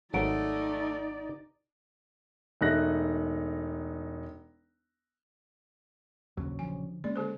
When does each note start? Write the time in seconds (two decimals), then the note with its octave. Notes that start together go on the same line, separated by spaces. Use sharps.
0.14 G#1 F#3 A3 D#4 D5 F#5 A#5 D7
2.61 E1 A3 D#4 F#6 A#6
6.37 A#1 D#2 C#3 F#3
6.59 D3 F3 G#5
7.04 G#3 A#3 C#4 D5
7.16 D3 A4 C5